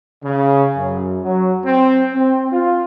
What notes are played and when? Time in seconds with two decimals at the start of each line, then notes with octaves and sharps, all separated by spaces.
0.23 C#3
0.76 F#2
1.23 F#3
1.65 C4
2.13 C4
2.51 F4